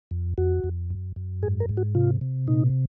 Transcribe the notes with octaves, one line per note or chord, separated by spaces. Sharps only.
F2
F2 F#4
F2
F#2
F#2
G#2 G#4
A#4
G#2
F#4
C3 F4
C3
A#2 D#4